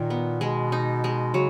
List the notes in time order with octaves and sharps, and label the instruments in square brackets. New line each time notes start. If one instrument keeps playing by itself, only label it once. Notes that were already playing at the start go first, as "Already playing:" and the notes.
Already playing: [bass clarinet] A#2 [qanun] D#3
[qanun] B3
[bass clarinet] B2 [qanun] G#3
[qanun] D#4
G#3
[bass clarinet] C#3 [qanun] F#3